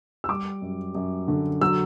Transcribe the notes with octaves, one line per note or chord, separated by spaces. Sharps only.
E6
G3 D6
F#2
F#2
D3
F#3 E6